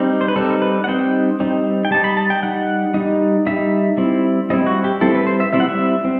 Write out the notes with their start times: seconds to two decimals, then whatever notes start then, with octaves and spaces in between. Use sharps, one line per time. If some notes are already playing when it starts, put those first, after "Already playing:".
Already playing: G3 C4 D#4
0.21 C5
0.28 B4
0.36 G3 C4 D#4 A4
0.62 B4
0.84 F#5
0.88 G3 C4 D#4 G5
1.40 G3 C4 D#4
1.85 G5
1.91 G3 D#4 A5
2.04 B5
2.17 A5
2.30 G5
2.43 G3 D#4 F#5
2.94 G3 D#4
3.46 G3 D#4 E5
3.97 G3 C4 E4
4.50 G3 C4 E4 D#5
4.66 F#4
4.84 G4
5.01 G3 C4 E4 A4
5.15 B4
5.27 C5
5.40 E5
5.53 G3 C4 E4 E5
5.60 F#5
5.69 E5
6.05 C4